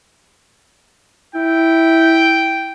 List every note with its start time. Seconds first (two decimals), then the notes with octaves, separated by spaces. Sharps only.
1.35 E4 G5